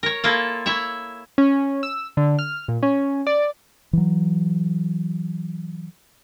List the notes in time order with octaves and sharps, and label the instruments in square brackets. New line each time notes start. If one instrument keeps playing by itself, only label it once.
[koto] A#4 C#5
A#3 E4 F4 A4
E4 C#5 E5
[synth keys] C#4
E6
D3
F6
A#2
C#4
D5
[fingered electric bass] E3 F#3